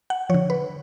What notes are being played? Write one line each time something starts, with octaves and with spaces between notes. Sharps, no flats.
F#5
D3 F3 C#5
B4